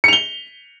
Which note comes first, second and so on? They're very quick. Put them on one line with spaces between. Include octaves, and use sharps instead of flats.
C#7 F7 G7